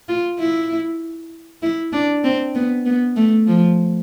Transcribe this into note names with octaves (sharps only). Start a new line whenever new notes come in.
F4
E4
E4
D4
C4
B3
B3
A3
F3